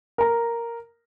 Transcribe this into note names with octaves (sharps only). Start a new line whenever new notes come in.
A#4 A#5